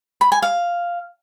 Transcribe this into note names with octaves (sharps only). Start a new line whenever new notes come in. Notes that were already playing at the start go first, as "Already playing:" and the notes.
B5
G#5
F5